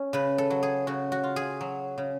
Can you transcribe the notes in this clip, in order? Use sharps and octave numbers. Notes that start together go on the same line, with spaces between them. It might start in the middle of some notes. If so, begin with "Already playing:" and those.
Already playing: C#4
C#3 B4
A4
F#3
G#4
C#3 F#4
F#4
F4
G#4
F#3
C#3